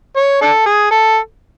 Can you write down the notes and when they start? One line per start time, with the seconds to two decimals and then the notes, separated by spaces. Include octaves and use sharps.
0.17 C#5
0.42 D4 A4
0.66 G#4
0.91 A4